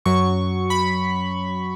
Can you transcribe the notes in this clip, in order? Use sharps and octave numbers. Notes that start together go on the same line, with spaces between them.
F#2 F#3 C#6
B5